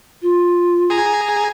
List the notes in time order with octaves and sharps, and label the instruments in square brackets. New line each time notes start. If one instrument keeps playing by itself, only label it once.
[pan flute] F4
[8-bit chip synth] G#4 G#5 A#5